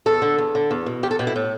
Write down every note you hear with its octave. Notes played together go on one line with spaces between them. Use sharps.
E2 A4
D3
E2
D3
E2
B2
E2 G4
A4
B2 G4
E4
A2